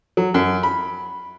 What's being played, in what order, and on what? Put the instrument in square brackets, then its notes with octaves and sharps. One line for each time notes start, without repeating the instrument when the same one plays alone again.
[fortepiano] F#3
F#2
B5